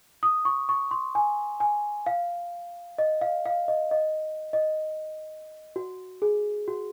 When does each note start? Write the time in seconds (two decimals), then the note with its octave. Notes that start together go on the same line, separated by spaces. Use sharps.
0.23 D#6
0.45 C#6
0.69 C#6
0.91 C6
1.15 G#5
1.60 G#5
2.06 F5
2.98 D#5
3.21 F5
3.46 F5
3.68 D#5
3.91 D#5
4.53 D#5
5.76 F#4
6.22 G#4
6.68 F#4